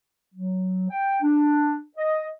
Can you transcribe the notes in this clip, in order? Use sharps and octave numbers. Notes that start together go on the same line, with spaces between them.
F#3
G5
D4
D#5